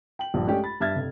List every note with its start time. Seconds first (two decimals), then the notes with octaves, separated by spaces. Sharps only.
0.19 G5 F#7
0.34 A#1 G2 F3
0.46 G#3 A3 C#4 D4 G4
0.63 B5 A6
0.80 G2 E5 F6 G#6 A6
0.95 F1